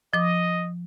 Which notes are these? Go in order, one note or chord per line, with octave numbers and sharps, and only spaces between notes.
F3 D#5 D6